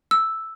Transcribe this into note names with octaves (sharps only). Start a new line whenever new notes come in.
E6